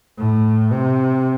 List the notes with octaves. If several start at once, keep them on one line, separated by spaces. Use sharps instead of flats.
A2
C3